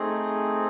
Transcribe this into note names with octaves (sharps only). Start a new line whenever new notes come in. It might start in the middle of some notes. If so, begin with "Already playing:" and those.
Already playing: A3 C4 D#4 G#4